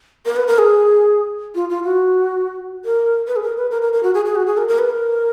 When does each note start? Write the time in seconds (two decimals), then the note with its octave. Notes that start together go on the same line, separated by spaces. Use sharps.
0.26 A#4
0.36 B4
0.47 A#4
0.58 G#4
1.55 F4
1.70 F4
1.84 F#4
2.85 A#4
3.27 B4
3.36 G#4
3.43 A#4
3.57 B4
3.71 A#4
3.82 A#4
3.93 A#4
4.03 F#4
4.14 G#4
4.25 G#4
4.35 F#4
4.47 G#4
4.57 A#4
4.68 A#4
4.79 B4
4.89 A#4